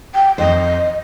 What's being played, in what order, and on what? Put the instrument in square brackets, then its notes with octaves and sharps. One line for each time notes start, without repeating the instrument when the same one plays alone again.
[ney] G5
[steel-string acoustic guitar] F2 C5 [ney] D#5